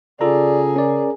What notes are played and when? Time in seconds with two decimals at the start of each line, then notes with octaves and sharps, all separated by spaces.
0.21 C#3 F4 G#4 A4 D5 A#5
0.76 C#4 A#4 D5